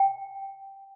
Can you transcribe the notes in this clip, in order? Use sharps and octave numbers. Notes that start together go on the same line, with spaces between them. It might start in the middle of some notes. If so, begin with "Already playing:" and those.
Already playing: G5